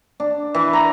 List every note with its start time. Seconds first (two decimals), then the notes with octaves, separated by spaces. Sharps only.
0.20 D4
0.54 E3
0.73 A#5